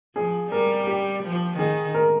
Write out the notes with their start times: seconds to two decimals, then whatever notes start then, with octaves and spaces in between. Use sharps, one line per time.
0.16 F3 G#4
0.51 G3 A#4
0.87 G4
1.23 F3
1.58 D#3 G#4
1.94 A#4